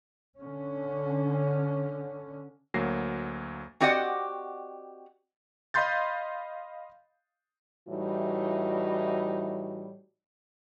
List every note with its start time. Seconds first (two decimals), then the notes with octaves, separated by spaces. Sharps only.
0.37 D3 C#4
2.74 D2 F#3 A#3 A#6 C7
3.80 C4 F#4 G4 D5 D#5 F#5
5.74 D#5 F5 B5 C6 G6 A6
7.88 A2 E3 G3 D#4 F#4